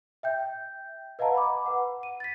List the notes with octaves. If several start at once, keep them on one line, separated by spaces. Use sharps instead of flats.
E5 G5 G6
B4 D#5 F5 F#5 A5 A#5
B5 D6
B4 F#5
D#7
A6 B6